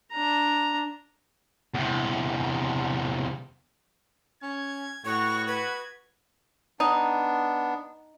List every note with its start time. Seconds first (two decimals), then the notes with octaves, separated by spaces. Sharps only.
0.11 D4 A#5
1.75 E2 C3
4.43 C#4 G#6
5.05 A2 B3 F#4 C#5 C#6
5.48 B4 G#6
6.80 B3 D4 D#4